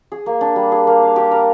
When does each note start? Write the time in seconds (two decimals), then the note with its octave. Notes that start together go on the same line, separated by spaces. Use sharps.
0.12 G#4
0.26 A#3
0.41 D4
0.56 G3
0.72 G#4
0.87 A#3
1.02 F5
1.16 G4
1.31 A#4